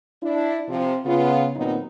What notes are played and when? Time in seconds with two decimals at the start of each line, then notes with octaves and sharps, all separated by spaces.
0.23 D4 E4
0.68 C3 F3
1.05 C#3 B3 F4
1.56 D#2 A#2 F#3 B3 C4 D#4